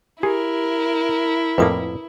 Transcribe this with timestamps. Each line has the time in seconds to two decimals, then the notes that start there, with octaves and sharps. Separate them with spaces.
0.23 E4 G4 G#4 A#4
1.58 F2 A2 A#3 B4 D#6